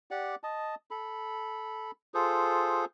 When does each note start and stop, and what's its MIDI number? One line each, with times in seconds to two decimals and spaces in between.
0.11 0.35 67
0.11 0.35 74
0.11 0.35 78
0.43 0.75 75
0.43 0.75 81
0.91 1.91 69
0.91 1.91 83
2.14 2.85 65
2.14 2.85 68
2.14 2.85 69
2.14 2.85 72